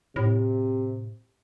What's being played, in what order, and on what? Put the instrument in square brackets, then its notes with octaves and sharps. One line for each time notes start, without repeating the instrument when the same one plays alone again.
[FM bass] A2 [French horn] C3